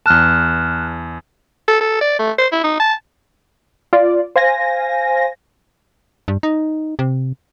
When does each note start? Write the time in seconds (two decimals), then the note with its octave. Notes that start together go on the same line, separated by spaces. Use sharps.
0.06 E2 A5 F6 F#6 E7
1.68 A4
1.81 A4
2.01 D5
2.19 A3
2.39 C5
2.52 E4
2.64 D#4
2.80 A5
3.93 F4 D5
4.36 C5 F5 G#5 A#6
6.28 G2
6.43 D#4
6.99 C3